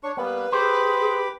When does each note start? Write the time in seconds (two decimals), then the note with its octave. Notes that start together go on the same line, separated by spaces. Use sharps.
0.03 D4 C#5 C#6
0.17 G3 A#3 B3 B4
0.52 G4 G#4 C5 B5 D6